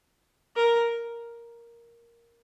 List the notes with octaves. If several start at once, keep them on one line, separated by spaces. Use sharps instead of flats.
A#4